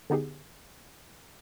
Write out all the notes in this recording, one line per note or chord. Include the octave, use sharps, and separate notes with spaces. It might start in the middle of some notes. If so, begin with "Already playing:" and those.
D3 B3 D#4 G4 G#4